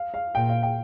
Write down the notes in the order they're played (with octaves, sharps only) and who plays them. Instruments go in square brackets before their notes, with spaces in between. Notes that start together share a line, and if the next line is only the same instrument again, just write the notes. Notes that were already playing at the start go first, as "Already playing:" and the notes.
Already playing: [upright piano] F5
F5
[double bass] A#2 [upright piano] G5
[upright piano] F5
G5